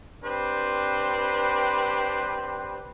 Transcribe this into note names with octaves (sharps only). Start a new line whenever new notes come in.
C4 D4 G4 B4 C5